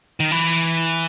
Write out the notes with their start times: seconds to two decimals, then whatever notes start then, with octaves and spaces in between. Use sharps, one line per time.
0.20 D#3
0.31 E3